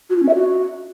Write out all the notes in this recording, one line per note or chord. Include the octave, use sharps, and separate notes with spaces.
F#4
F4
C#4
E5
F#4